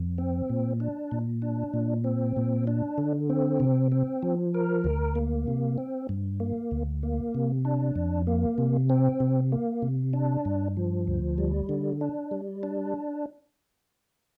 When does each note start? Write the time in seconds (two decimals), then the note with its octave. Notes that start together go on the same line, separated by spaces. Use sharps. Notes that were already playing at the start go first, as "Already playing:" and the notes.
Already playing: F2
0.18 C4
0.50 A#2
0.80 D4
1.11 A#2
1.42 D4
1.74 A#2
2.04 C4
2.37 A#2
2.67 D4
2.98 D3
3.30 C4
3.60 C3
3.92 C4
4.22 F3
4.54 A#4
4.84 D2
5.15 A#3
5.47 C3
5.78 C4
6.09 G2
6.40 A#3
6.71 D2
7.03 A#3
7.35 C3
7.65 D4
7.96 F2
8.27 A#3
8.58 C3
8.90 C4
9.20 C3
9.52 A#3
9.82 C3
10.13 D4
10.45 G2
10.77 F3
11.07 D2
11.38 G3
11.69 D3
12.01 D4
12.31 G3
12.63 D4